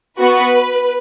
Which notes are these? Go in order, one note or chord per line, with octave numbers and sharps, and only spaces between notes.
B3 F#4 B4